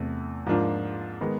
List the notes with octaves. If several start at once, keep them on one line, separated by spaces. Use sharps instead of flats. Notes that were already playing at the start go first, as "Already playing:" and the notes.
Already playing: E2 C3 E3 A3
G#2 F3 A#3 D4 F4
D#3 G#3 B3